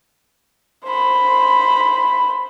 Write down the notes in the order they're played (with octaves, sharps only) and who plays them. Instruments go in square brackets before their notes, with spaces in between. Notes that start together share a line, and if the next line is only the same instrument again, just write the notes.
[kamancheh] C5 B5